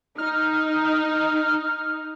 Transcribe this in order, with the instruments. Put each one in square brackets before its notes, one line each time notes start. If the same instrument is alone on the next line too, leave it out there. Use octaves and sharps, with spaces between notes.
[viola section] D#4 [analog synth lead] F6